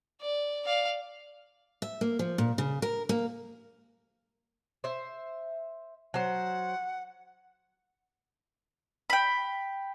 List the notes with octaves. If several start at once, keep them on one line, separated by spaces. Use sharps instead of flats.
D5
D5 F5
E5
A#3
F3
A#2
C#3
A#4
A#3
C5 E5
F#3 C5 F#5
G5 B5